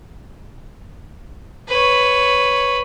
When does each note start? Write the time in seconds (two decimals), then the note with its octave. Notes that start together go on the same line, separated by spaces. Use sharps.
1.69 B4 C#5